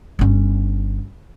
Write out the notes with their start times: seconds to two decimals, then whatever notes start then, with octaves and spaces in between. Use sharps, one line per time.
0.19 G1 C#4